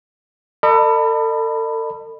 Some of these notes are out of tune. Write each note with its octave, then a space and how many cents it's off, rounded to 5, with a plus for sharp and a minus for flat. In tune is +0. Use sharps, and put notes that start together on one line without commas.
A4 +40 D#5 -40 B5 +0